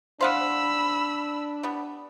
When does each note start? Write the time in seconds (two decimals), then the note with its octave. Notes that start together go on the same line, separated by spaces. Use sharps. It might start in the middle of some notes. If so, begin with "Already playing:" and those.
0.21 D4 C5 F5 F#5 B5 E6
1.63 G3 B3